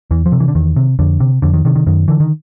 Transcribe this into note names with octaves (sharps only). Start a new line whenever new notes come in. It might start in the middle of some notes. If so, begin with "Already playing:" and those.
E2 E3
F3
C3
E3
D3
E2 D#3
C3
F2 D3
C3
F2 D3
D#3
C3 D#3
D#3
F#2 D#3
D3 E3
D#3